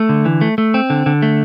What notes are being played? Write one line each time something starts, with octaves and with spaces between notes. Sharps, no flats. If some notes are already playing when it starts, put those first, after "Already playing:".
Already playing: A3
D3
E3
A3
A3
C4
D3
D3
A3